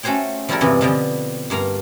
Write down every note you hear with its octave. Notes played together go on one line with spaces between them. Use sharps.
A3 C#4 F#4 C5 C#5 G5
F3 G3 E4 F#4 A4 A#4
E2 G2 C3 E3 B3
B2 D3 F3 G4 D#5 G5
G2 A#3 F5 A#5